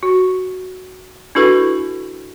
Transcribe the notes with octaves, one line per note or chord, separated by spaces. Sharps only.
F#4
D4 E4 F#4 A4 B4 C#6